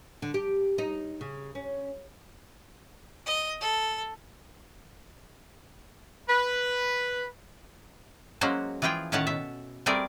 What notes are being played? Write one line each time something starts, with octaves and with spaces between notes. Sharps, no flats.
D3
G4
D#4
C#3
C#4
D#5
A4
B4
F#3 G#3 A#3 C#4 F#4 C5
E3 F3 F4 G#4 G5
A2 D#3 C#4 C#5 F#5 A5
B2 E5
G3 A3 C4 G#4 A#4 D5